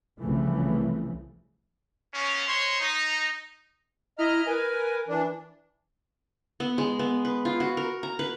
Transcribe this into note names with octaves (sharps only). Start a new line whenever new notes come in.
C2 C#3 E3 F3 A3
A#3 B3 C#4
G#3 C5 C#5 C6
D#4
E4 D#5 A#5 F6
A#4 B4 G#5
E3 D4
B3
G#3
B3
B4
F4
F#4
A#4
A#5
B4